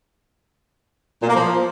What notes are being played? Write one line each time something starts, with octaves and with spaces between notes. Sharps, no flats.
A#2
A#3
F3